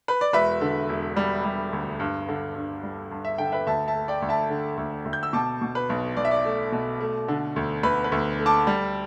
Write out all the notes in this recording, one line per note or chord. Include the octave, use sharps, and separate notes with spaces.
B4
D5
E1 B4 E5
D3
E1
G3
G3
D2
G2
D3
G2
G3
G2
E5
D3 G5
B4 E5
D2 E5 A5
E5 A5
A3
D5 G5
D2
E5 A5
D3
D2
D2
G6
E6
B2 A5 D6
B2
B4
B1
B1 D5
E5
D5
A3
B2
A3
D3
D2
D2 B4
B4
D2
A3
A5 D6
G3